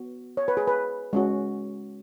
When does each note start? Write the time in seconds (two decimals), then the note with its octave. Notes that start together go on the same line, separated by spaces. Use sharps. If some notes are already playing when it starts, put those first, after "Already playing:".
Already playing: B3 F#4
0.37 C#5
0.48 B4
0.57 G#4
0.67 B4
1.13 G#3 C#4 F#4